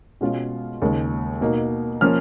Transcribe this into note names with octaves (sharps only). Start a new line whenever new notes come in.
B2 G#3 C#4 F4
D#2 C#3 G#3
B2 A#3 D#4
F3 A#3 C#4 F6